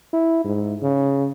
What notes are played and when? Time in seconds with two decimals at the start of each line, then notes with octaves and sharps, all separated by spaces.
0.13 E4
0.44 G#2
0.82 C#3